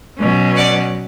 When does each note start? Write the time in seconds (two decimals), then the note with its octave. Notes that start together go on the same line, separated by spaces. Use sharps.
0.19 B2 F#3 C#4
0.56 D5 F#5